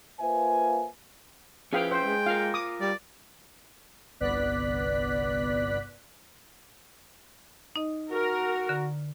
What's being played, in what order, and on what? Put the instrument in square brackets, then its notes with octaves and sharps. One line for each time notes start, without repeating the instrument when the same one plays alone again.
[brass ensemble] A#3 F4 B4 C5 E5 G#5
[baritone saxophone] F3 [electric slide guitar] C#4 E4 B4 [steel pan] G#4 F5 G5
[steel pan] C5 [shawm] G5
[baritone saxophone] G#3
[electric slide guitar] F4 A#4 [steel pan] F5
[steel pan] D6 D#6
[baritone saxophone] G3 [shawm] D5
[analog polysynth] G1 C2 B3 D5 F#6 B6
[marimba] D#4 D#5
[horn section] F#4 [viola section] A#4
[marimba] D3